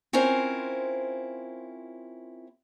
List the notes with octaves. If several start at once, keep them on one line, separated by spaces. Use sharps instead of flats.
C4 C#4 E4 F4 A#4 C5